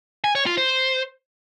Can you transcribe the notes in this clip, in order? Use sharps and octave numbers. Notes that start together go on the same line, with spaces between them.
G#5
C#5
F4
C5